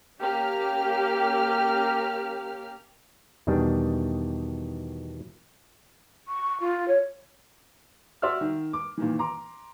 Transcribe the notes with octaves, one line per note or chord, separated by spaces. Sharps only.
A#3 C#4 G4 F6
E2 B2 D#3 G3 D4 G#4
C#6
F4
C#5
F#4 D5 E5 C6 E6 F6
D#3
D6
A#2 D#3 E3
A#5 C6 D6